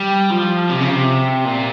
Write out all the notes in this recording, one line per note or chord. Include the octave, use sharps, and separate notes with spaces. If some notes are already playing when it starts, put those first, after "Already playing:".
Already playing: G3
F3
C3
C#3
C3
A#2